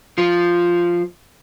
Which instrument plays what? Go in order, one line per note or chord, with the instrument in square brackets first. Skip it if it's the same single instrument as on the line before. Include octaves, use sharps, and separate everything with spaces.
[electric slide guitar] F3 F4